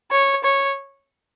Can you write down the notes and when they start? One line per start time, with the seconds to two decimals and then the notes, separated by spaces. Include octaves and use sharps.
0.11 C#5
0.44 C#5